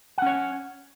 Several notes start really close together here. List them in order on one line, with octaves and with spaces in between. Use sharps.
F#5 C#4 C#5